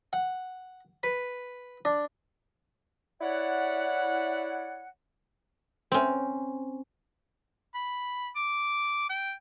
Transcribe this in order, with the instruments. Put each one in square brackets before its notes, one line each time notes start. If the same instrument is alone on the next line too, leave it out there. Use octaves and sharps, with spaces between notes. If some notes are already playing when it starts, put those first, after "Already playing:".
[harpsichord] F#5
B4
D4
[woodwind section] E4 C#5 D5 F#5
[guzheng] C4 C#4
[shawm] B5
D6
G5